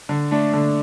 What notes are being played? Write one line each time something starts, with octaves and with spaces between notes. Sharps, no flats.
D3
A3 D4
D3